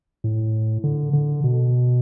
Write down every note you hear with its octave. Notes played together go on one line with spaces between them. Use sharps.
A2
D3
D3
B2